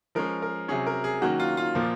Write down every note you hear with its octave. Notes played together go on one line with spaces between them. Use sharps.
F3 G#3 C#4 A#4
A#4
C3 F#3 C#4 G#4
A#4
G#4
D#3 F#3 A#3 C#4 F#4
F4
F4
A#2 F3 A#3